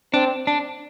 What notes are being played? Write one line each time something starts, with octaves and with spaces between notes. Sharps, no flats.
C4 D4
D4